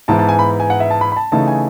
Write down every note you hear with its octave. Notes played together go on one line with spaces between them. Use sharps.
G#2 E3 B3 E4 A5
A5
G#5
B5
G#5
F#5
E5
A5
B5
B5
A5
C#3 E3 A3 D#4 A5
G#5